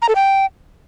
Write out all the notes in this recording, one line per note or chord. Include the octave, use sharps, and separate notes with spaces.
A#5
A4
G5